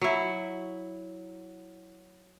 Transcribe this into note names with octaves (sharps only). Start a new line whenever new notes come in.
F#3 E4